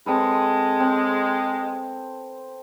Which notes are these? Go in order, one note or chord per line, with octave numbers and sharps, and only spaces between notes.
G#3 C4 A4 B4
C4